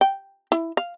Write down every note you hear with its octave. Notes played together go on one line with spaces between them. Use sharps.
G5
E4
F5